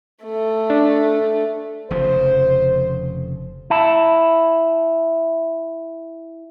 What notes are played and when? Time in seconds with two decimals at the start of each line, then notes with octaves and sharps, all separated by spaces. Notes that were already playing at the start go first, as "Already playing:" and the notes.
0.24 A3
0.70 D4
1.91 F1 C#3 F3 C5
3.70 E4 A5